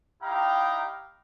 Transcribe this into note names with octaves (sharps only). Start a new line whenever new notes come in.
D#4 E4 G4 F5 G5 A#5